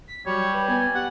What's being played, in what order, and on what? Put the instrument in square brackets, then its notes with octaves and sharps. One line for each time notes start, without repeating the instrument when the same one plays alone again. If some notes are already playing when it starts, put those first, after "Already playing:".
[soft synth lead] B6
[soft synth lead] F#3 [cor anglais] G3 [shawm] C#5
[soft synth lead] B4
[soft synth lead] B3 [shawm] G#5
[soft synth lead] G4 [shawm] F#5